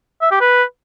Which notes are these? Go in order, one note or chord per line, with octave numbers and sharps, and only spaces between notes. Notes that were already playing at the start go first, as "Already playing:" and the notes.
E5
G4
B4